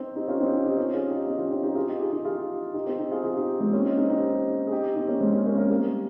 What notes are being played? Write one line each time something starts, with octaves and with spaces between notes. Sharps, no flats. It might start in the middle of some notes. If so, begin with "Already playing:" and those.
Already playing: C4 D#4
D#4 G4
C#4 F4
C4 D#4
D#4 G4
D#4 G4
C#4 F4
F4 G#4
D#4 G4
C4 D#4
G4
C#4 F4
D#4 G4
D#4 G4
F4 G#4
D#4 G4
F4 G#4
D#4 G4
F4 G#4
D#4 G4
C4 D#4
D#4 G4
F4 G#4
F4 G#4
D#4 G4
G#3 C4
A#3 C#4
C4 D#4
C4 D#4
D#4 G4
G#4
D#4 G4
C4 D#4
A#3 C#4
G#3 C4
A#3 C#4
A#3 C#4
A#3 C#4
G3 A#3